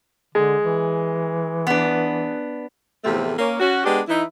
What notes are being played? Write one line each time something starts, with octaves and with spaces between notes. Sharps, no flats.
D3 G#3
E3
B3 D4
E2 A2 C3 F3 A3
A#3 C#4
C#4 F#4
G#3 B3 D4 G4
E3 D#4 E4